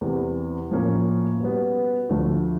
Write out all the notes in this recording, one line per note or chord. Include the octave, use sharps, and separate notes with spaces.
E2 C3 E3
A2 F3 A#3 C#4
B2 G3 B3
D2 D3 F3 A3